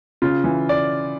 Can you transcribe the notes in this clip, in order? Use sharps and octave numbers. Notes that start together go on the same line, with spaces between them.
C#3 F4
E3
D5